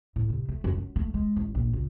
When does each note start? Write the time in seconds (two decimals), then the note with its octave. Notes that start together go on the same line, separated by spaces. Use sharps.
0.16 A2
0.30 C3
0.49 A3
0.64 F#2
0.78 F#2
0.96 A3
1.14 G#3
1.36 A1
1.55 A#1
1.73 C#2